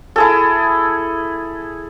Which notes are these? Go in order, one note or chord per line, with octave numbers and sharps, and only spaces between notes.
E4 G#4 A4